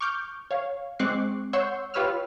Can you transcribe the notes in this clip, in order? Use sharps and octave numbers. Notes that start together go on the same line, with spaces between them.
C#6 D6 F6 G6
C#5 F5
G#3 C4 C#6 D6 F#6 C7
C#5 F#5 C6 C#6 E6 G6
F4 G4 B4 C#5 E6 F6